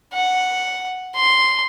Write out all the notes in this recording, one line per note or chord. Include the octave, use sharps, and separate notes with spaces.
F#5
C6